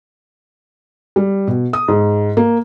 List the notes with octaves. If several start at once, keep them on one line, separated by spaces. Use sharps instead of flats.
G3
B2
D#6
G#2
A#3